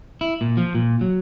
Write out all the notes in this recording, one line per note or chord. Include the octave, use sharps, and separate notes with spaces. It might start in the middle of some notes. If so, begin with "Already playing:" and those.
E4
A#2
F3
A#2
F#3